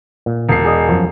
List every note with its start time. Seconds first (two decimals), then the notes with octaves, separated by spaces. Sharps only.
0.26 A#2
0.49 E1 C7
0.65 G#4 D5 D#5
0.89 F#2 F3